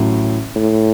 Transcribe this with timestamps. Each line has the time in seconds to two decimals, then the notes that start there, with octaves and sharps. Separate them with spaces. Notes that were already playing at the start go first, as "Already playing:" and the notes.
Already playing: A1 A2 F#3
0.56 A2